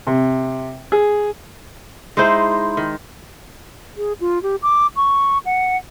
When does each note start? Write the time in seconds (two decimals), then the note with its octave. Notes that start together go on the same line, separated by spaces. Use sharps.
0.07 C3
0.92 G#4
2.17 G#3 D#4 E4 C5
2.77 D#3
3.97 G#4
4.20 F4
4.43 G4
4.62 D6
4.96 C#6
5.45 F#5